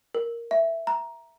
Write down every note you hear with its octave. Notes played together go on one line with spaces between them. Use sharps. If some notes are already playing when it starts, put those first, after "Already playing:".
A#4
E5
A#5